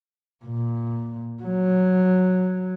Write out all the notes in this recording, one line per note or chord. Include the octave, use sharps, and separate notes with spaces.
A#2
F#3